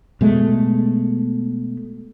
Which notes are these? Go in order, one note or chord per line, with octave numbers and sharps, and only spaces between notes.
B2 G#3 A3